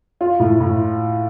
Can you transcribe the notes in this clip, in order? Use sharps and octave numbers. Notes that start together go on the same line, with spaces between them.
F4
A2
A2